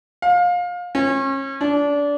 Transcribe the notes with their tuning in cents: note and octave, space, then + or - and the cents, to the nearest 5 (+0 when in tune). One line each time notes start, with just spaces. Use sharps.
F5 +25
C#4 -35
D4 -25